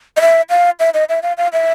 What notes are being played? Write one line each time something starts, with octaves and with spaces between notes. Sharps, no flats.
D#5
E5
F5
E5
D#5
E5
F5
F5
E5